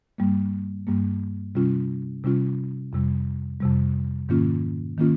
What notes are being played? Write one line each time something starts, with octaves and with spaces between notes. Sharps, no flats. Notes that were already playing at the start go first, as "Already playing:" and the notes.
G2 G3 A#3
G2 G3 A#3
C3 G3 C#4 F4
C3 G3 C#4 F4
F2 C3 G3
F2 C3 G3
G#2 D#3 A#3 C#4 F4
D#3 A#3 C#4 F4